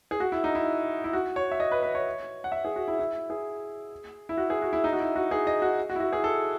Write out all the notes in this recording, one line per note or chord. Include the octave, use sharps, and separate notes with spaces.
G#4
F#4
E4
D#4
E4
E4
F#4
C#5
E5
D#5
B4
B4
C#5
F#5
E5
G#4
F#4
E4
E4
G#4
E4
F#4
G#4
F#4
E4
D#4
F#4
E4
F#4
G#4
D#5
F#4
F#4
E4
F#4
G#4
A4